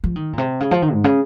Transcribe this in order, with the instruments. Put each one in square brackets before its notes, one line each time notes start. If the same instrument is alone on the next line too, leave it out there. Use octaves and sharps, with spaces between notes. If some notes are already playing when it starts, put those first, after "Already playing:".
[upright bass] F3
D#3
A#2
C3
C#3
F3
D#3
G#2
C#3